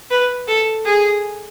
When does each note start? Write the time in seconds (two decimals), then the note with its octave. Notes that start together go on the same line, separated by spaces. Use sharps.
0.11 B4
0.47 A4
0.85 G#4